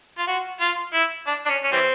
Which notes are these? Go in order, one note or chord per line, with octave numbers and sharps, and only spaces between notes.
F4
F#4
F4
E4
D4
D4
C#4
C#4
E3 G3 C4